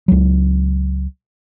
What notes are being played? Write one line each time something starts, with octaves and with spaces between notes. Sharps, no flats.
C#2 F#3